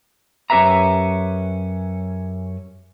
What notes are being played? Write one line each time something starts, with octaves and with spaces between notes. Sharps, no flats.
F#2 C#4 G4 B4 E5 A#5